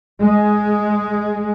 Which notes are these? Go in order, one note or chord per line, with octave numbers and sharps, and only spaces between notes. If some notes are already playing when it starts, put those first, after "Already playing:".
G#3